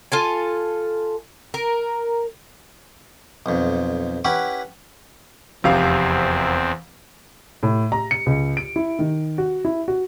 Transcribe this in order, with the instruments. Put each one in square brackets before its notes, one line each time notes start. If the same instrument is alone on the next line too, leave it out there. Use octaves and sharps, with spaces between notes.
[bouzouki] F4 A4 G#5
A#4
[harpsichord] B1 F2
C#4 E4 G4 B4 F#5
[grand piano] F1 C3 F5 [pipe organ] E2 C4
[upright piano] A2
A#5
C#7
C#2
D7
E4
D#3
F#4
E4
F#4